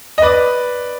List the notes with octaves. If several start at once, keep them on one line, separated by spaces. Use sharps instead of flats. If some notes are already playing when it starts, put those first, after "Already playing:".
D#5
B4 D5